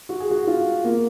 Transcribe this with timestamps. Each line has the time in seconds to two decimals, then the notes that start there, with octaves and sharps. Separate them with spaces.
0.09 F#4
0.20 G#4
0.31 F#4
0.47 F4
0.84 A#3